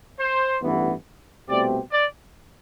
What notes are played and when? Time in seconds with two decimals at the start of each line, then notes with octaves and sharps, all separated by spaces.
0.18 C5
0.62 A1 G2 E3 B3
1.48 C2 B2 A3 C4 G4 D5
1.91 D5